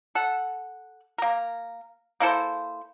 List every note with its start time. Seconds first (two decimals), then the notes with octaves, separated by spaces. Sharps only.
0.15 A4 F#5
1.18 A#3 A#4
2.20 A#3 E4 A4 C5